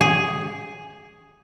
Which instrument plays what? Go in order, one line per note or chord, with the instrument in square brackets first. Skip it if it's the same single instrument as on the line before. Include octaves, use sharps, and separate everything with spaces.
[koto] G#4